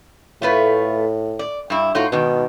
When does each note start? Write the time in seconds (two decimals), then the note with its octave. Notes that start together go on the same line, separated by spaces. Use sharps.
0.42 A2 A3 F4 B4
1.39 D5
1.70 G2 E4
1.95 A2 D#4 F4 F#4
2.12 G#2 B2 D#3